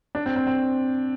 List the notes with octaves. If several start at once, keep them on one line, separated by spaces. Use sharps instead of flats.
D4
C4
C4
C4